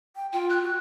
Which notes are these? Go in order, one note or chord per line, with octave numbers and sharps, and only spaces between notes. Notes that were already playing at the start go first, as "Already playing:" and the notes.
G5
F4 G5
F#6
F#4